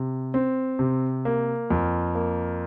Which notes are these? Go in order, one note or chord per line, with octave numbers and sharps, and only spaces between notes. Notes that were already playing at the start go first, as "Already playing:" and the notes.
Already playing: C3
C4
C3
A#3
F2
A#3